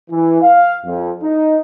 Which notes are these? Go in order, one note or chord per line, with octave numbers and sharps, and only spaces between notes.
E3
F5
F2
D#4